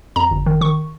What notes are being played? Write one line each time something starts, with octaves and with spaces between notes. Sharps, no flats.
F2 A#5
G1
D#3
D#3 C#6